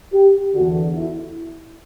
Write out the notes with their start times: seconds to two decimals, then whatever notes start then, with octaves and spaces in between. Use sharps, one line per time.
0.13 G4
0.54 E2 D3 F#4
0.95 E4